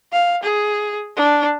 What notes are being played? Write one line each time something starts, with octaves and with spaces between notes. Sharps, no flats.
F5
G#4
D4